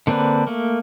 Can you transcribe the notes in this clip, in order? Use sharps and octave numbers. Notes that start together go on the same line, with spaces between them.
D3 A#3 C4 D4 B4
A3 A#3